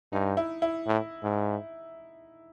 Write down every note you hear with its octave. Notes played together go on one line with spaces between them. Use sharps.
G2 D#4
E4
E4
A2
G#2